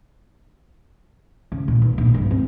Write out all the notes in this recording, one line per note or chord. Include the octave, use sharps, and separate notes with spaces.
C#3
A#2
B1
A#1
G2
C4